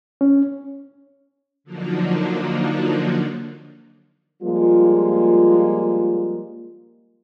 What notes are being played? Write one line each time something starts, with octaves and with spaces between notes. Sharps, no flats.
C#4
D3 F3 F#3 A#3 D4 D#4
F3 G3 G#3 A#3 F4